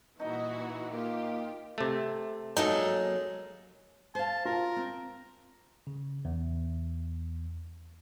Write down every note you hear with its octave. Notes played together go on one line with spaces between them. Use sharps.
A#2 E3 D#4 F#4 D#5
A#3 F4 G4
C3 A3
F#3 G#3 A#3 D#4 A4
C5 F5 A5
F4 A#4
C4
C#3
E2